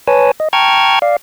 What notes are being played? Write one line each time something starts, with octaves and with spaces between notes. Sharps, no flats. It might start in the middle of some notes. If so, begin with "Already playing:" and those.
B4 C#5 G#5 A5
D#5
G5 A5 A#5 C#6 F6 G#6
D5 F5